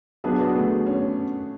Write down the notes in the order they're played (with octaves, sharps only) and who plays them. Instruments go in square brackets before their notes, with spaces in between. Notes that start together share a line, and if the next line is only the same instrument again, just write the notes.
[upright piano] F#3 B3 D4 [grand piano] G#4
[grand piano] F#4
A3
C#4